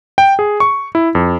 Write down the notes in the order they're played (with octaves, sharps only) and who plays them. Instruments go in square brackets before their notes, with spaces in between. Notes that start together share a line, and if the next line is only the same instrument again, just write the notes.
[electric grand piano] G5
G#4
C#6
E4
F2